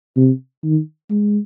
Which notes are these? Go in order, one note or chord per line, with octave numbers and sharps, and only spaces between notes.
C3
D#3
G#3